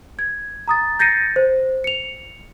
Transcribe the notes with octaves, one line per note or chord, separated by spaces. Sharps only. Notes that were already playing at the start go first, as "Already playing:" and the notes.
G#6
A#5 D#6 A6
G6 A6 A#6 C7 C#7 D#7
C5
C#7 F7